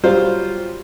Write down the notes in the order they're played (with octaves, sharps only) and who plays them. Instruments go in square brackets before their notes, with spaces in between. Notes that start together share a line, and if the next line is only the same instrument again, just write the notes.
[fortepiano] F#3 G3 F4 C5 F5